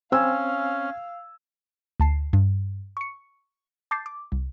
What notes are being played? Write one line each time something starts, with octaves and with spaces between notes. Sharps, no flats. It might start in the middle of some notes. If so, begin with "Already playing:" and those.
C4 C#4 F5 G#5 E6
D2 A5 C7
G2
C#6 C#7
A5 D6 G6 A6 C7
D6
C2